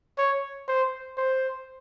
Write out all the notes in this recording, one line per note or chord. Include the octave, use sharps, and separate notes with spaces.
C#5
C5
C5